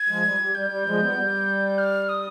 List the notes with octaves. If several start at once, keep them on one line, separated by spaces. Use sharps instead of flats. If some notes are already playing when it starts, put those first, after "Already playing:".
Already playing: G#6
F3 G#3
G3
G3
G3 G6
G3
F3 G#3
G3 B3
G3
F6
D#6